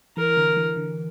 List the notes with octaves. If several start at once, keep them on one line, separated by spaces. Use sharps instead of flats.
E3 A#4
D3
E3
D3